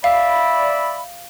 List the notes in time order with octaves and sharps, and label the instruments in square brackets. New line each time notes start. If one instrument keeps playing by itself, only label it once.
[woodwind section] D5 E5 B5 [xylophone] F5